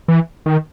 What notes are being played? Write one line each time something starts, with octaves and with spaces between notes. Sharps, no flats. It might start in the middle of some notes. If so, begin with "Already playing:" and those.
E3
D#3